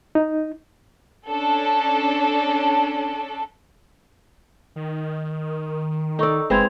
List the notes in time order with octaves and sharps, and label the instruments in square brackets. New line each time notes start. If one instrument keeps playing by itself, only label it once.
[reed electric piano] D#4
[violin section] C#4 D4 A4
[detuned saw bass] D#3
[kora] D#4 D5 [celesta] A4 C#6 E6
[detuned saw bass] F#1 [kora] G#3 C4 E4 [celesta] B4 G#6 F7